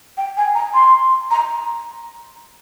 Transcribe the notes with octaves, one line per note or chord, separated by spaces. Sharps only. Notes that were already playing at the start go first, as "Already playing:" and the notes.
G5
G#5
A#5
C6
A#5